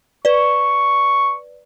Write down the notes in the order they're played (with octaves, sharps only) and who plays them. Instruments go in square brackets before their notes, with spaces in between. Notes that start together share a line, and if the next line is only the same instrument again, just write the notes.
[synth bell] B4 D5 [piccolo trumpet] C#6